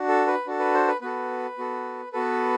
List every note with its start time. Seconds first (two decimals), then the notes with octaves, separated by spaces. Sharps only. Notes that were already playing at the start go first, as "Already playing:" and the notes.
Already playing: D4 F#4
0.08 A4
0.27 B4
0.47 D4 F#4 A4
0.59 B4
0.74 C5
0.88 B4
1.01 B3 F#4 A4 B4
1.58 B3 F#4 A4
2.12 B3 F#4 A4 B4